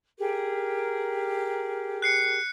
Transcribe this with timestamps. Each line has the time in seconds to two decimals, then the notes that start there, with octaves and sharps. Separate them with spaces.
0.18 G4 G#4 A#4
2.02 F#6 C7 C#7